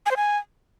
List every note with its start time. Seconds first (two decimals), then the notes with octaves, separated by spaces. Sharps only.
0.06 G#5
0.11 C5
0.16 G#5